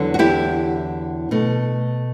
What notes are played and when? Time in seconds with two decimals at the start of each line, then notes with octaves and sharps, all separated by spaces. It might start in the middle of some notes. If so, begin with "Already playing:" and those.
Already playing: E2 D3 F#3
0.14 F#4
0.19 E4 G4
1.31 B2 A3